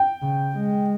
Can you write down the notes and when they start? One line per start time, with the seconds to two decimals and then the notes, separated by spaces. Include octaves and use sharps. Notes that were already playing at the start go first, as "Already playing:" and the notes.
Already playing: G5
0.22 C#3
0.55 G#3